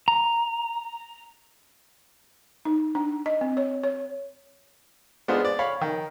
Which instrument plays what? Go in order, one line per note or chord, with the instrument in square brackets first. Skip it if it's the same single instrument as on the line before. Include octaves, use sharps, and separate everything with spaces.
[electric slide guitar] A#5
[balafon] D#4
D4
D#5
C4
C#5
C#5
[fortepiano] G#3 B3 D4 F4 G#4 C5
D5
C#5 F5 B5
D#3